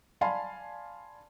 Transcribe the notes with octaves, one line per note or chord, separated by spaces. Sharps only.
D5 F5 G#5 A5 B5 C6